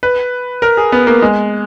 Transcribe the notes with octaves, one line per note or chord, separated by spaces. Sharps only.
B4
A#4
G#4
B3
A#3
G#3